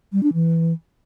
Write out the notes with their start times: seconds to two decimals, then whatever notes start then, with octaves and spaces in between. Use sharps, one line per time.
0.13 G3
0.23 D4
0.33 E3